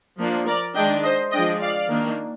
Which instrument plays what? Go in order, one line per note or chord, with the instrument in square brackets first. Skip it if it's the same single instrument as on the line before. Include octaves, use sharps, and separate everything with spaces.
[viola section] F3 A#3 D4
A#4 D5
D#3 G#3 D4 D#5 G5
C5 D#5
F3 G#3 D4 D#5 G5
D5 F5
D#3 A#3 D4